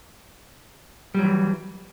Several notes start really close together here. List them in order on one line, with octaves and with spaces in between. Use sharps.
G3 F#3 E3